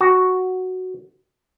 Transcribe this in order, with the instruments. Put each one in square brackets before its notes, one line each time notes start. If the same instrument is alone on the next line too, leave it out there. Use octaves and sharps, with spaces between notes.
[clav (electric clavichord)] F#4